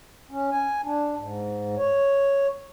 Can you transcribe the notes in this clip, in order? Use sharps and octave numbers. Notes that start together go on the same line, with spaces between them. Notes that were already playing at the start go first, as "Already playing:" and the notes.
C#4
G#5
D4
G#2
C#5